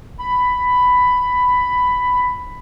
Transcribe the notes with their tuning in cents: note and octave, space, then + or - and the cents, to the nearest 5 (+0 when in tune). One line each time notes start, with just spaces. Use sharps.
B5 +10